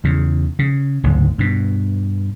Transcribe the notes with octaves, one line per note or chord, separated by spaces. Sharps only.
E2 C#3
C#3
F#1 D2 G#2
G2 B2